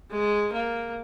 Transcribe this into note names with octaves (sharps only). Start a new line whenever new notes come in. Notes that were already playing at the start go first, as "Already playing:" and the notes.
G#3
A#3